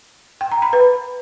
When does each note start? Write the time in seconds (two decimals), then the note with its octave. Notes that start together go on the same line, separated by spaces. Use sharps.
0.41 G5
0.52 A#5
0.62 B5
0.73 B4